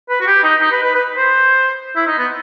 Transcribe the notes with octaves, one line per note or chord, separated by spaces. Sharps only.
B4
F#4
G4
D#4
D#4
B4
B4
B4
C5
E4
D#4
B3